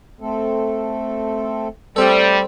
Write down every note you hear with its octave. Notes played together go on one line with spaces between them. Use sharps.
A3 C4 A4
G3 A3 C4 A4